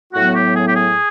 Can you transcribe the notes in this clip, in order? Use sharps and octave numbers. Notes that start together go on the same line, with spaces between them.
A2 F#3 B3 F#4
G4
G#4
G4
G#4